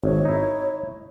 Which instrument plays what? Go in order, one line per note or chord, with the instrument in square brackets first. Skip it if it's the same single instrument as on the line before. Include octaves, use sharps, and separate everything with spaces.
[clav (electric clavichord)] G#1 [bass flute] C#5
[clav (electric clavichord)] D#4 E4